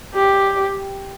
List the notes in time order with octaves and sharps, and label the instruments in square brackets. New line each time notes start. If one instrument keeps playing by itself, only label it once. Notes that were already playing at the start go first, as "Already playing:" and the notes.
[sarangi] G4